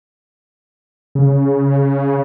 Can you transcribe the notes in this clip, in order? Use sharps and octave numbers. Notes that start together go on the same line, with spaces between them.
C#3